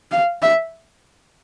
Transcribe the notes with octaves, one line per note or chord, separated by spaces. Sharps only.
F5
E5